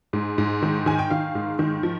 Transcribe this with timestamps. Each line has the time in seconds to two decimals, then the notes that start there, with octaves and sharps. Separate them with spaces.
0.13 G#2
0.38 G#2
0.62 D#3
0.86 D#3 G#5
0.99 G5
1.10 D#3 F5
1.35 G#2
1.59 D#3
1.83 F3